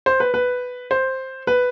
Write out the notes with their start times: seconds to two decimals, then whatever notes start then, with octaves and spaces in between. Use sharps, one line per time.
0.06 C5
0.20 B4
0.34 B4
0.91 C5
1.47 B4